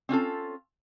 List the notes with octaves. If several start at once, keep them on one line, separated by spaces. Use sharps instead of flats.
C4 C#4 F4 A4